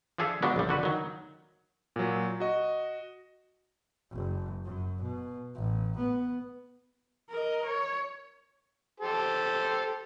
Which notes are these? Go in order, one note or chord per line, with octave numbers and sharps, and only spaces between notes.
F3 D4 G#4 A4 E5 F5
F3 F#3 G#3 B3 D4
A#1 G3
D3 F#4 B4
D#3 F#3
A#2 F#3
F#4 D#5
F#1
F#2
B2
A1
B3
A#4 D#5
C#5
G4 A4 C5